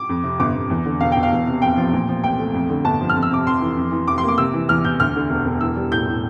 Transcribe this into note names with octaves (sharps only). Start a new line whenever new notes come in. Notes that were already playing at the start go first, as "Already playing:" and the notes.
Already playing: D6
F2
C3
G1 D6
G1
E2
D3
E1 F5
E1 G5
F5
E2
C3
F1 G5
F3
A#2
F3
C2 G5
A3
F2
D3
G1 A5
F3
F6
F2
E6
C3 D6
F1 C6
E3
F2
E3
F1 D6
C6
A#3 D6
C3 E6
E3
E2 F6
E2 G6
D2 F6
D3
E1
E1
E3 E6
G3
A2 G6
A2